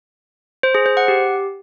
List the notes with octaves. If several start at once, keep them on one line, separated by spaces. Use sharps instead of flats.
C5
G#4
C5
F#5
G4